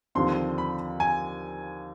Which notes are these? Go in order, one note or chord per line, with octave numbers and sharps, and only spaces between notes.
D#2 D3 F3 C4 C6
B5
G#5